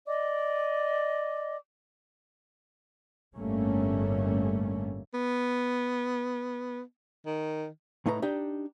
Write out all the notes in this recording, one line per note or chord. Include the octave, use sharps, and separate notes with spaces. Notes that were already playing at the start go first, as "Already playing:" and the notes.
D5 D#5 D6
G1 A2 G3 A3 A#3 C#4
B3
D#3
A2 A3 D#4 B4 A#5
D4 D#4 G4